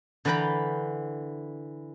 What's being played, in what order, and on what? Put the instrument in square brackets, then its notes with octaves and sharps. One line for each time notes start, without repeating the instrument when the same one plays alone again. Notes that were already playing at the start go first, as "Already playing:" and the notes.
[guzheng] D3 E3 B4 G5 A#5 B5